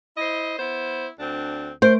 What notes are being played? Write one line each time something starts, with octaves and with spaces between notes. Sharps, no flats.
E4 C5 D#5
B3 E4 C5
D2 C4 D4
A3 A#4 C5 D7